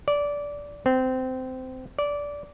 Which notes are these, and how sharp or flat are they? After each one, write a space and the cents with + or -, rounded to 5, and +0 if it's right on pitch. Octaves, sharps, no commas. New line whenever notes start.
D5 -15
C4 -20
D5 -15